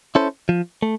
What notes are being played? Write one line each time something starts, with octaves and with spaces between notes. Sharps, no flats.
C#4 E4 A4 C5
F3
A3